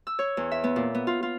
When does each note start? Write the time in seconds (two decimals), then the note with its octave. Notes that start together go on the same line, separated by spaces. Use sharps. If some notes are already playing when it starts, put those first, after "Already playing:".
0.07 E6
0.19 C#5
0.37 E2
0.51 E5
0.64 B3
0.76 A#2
0.95 B3
1.07 F4
1.23 F4